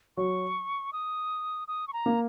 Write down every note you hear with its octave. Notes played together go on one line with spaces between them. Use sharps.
F#3 C#6
D#6
D#6
C#6
A#5
A#3